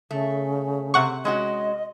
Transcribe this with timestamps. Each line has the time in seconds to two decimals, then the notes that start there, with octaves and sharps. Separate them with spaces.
0.11 C#3 A3
0.94 C3 F#5 C#6
1.25 G#3 C#4 F#4 D#5